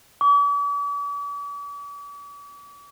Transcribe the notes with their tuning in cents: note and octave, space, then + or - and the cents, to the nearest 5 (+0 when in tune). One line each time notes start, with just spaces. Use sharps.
D6 -45